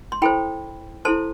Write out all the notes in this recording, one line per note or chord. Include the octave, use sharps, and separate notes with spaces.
C6
E4 A4 C5 G5 B5
E4 A4 C5 A5 C6